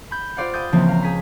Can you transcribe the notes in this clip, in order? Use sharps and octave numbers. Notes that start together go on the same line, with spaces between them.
B5 G6
F4 G4 C5 D5 F5 F#5
G5 B5 D#6 G6 A6
C#2 E3 F3 A#3 C4
F5 A#5
G#4 B6